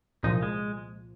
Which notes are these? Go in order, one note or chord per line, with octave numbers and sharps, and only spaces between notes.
C2 A#2 F3 D#4
G#3